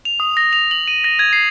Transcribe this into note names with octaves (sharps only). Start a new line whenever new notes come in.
F7
D#6
A#6
F7
F#7
D#7
A#6
G#6
C7